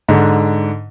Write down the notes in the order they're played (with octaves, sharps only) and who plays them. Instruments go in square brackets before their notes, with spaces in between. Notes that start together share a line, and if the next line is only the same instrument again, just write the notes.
[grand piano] G#2 D3